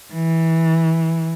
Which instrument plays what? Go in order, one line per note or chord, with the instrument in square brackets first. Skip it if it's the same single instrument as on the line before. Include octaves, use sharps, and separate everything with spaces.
[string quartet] E3